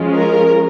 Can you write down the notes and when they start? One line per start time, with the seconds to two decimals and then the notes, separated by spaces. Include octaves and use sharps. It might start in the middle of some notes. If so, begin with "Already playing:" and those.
Already playing: F3 G#3 C#4 F4
0.14 A#4